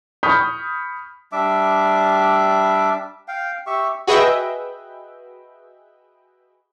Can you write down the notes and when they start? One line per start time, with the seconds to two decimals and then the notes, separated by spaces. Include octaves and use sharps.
0.23 B5 C#6 D#6 F6 G6 B6
1.32 G3 D4 E5 D6
3.28 F5 G5
3.67 G4 E5 C#6
4.07 F#4 G#4 B4 D#5 E5 G5